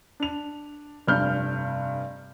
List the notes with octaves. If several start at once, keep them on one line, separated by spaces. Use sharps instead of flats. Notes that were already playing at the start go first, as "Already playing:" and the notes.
D4 F7
F1 G2 F6 G6